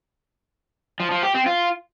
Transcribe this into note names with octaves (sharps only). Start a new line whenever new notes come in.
F3
F3
G4
C4
F4